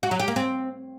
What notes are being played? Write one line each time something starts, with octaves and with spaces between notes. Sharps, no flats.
F#4
F#3
G4
A#3
C4